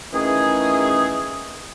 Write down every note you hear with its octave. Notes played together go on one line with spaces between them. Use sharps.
D#3 E3 A3 C#4 G#4